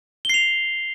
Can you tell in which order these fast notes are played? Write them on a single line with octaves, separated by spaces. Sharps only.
G7 C7 F7